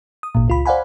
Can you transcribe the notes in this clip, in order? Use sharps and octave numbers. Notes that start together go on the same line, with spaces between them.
D#6
G#1 A#2
C#2 F4 B5
C5 D5 F5 F#5 G#5 B5